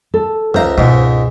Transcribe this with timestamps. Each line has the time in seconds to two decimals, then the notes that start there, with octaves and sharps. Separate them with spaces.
0.14 A4
0.54 C#2 C5 E5 F5 A#5
0.78 C#2 G#2 B2